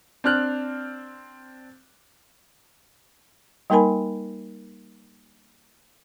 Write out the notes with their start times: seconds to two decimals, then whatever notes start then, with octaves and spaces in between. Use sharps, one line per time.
0.24 C4 D4 F6 F#6
3.70 G3 A#3 D#4 A#4 G#5 B5